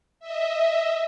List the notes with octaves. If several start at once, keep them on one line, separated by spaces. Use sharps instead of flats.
D#5 E5